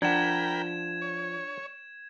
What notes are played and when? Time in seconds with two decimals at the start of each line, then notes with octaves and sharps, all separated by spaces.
0.02 F3 D4 A#4 F#5 G5 B5 G#6 E7
1.01 C#5